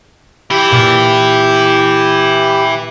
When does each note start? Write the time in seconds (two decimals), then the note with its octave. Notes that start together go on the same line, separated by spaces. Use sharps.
0.51 E3 E4 G4
0.71 A#2 F6 A6